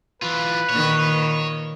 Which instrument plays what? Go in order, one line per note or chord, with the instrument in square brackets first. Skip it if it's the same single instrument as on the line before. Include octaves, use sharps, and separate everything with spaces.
[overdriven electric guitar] E3 F4 [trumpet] B4
[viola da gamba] A#2 D#3 [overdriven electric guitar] C#5